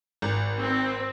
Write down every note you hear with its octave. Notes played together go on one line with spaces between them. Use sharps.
G#1
C4